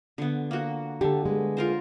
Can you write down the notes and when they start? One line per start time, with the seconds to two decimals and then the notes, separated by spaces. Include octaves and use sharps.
0.18 D3 B3
0.51 A#3 F#4
1.01 D3 G4 A4
1.25 G#3 B3
1.57 F4 A#4 C5